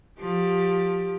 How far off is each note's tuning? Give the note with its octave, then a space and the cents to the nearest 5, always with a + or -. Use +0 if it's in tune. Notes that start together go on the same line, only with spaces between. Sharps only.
F3 +20 G4 +0